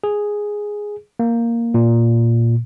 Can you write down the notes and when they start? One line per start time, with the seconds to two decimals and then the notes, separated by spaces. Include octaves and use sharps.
0.04 G#4
1.19 A#3
1.74 A#2